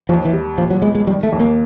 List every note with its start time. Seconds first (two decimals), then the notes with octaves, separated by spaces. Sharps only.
0.09 D#2 F3
0.25 E3
0.33 G3
0.58 A#2 F3
0.71 F#3
0.82 G#3 B3
0.95 G#3
1.07 D#3 G3
1.23 A3
1.32 D#2
1.40 A#3